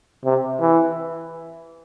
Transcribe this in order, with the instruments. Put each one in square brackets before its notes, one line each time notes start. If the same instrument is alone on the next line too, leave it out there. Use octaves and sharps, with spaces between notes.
[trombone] C3
E3